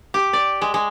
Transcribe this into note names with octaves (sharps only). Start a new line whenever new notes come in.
G4
D5
G#3
G#3